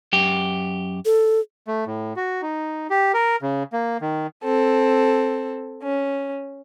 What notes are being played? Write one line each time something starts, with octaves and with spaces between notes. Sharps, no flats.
F#2 G4
A4
A3
A2
F#4
D#4
G4
A#4
C#3
A#3
D#3
C4 A4
C#4